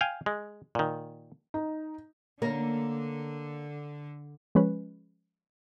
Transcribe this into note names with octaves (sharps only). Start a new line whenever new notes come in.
F5 G5 G#5
G#3
A#2 D#3
D#4
D3 A#3 C#4 A#4
F3 G#3 C#4 B4